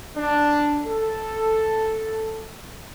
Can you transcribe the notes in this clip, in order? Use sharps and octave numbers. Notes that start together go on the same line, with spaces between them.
D4
A4